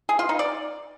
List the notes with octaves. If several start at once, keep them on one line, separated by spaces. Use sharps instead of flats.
G#4
F4
D#4
D5